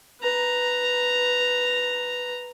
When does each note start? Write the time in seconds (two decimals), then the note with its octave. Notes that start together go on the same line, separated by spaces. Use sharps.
0.21 B4 A#5